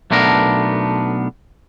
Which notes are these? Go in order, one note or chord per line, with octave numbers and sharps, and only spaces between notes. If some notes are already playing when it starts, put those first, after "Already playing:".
B1 A3 B3 D4 A#4